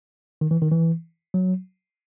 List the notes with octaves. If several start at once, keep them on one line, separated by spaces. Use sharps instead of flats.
D#3
E3
D#3
E3
F#3